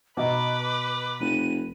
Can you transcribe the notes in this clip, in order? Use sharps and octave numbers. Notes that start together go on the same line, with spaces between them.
B2 B4 D#5 A#5 D6
F1 D#7